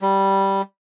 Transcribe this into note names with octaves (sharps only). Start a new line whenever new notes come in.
G3